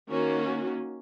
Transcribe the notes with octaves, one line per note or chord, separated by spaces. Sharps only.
D#3 A#3 C#4 F#4